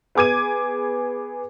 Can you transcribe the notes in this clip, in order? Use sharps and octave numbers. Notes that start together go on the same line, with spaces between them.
B3 G#4 D6 G#6 D#7